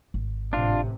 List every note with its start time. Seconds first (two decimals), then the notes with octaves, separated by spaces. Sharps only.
0.14 G#1
0.53 A1 A2 C3 D4 F4